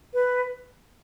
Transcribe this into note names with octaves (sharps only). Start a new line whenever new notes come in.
B4